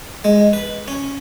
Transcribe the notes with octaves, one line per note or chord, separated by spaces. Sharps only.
G#3
B4
C#4